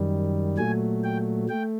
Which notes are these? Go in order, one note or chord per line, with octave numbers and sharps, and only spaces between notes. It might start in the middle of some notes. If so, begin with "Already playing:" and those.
Already playing: F#2 D#3 G3
A#2 F#3 A3 G#5
G5
A3 G5